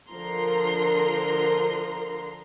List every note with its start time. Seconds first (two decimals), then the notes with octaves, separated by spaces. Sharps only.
0.10 D3 F3 A#4 A#5 C6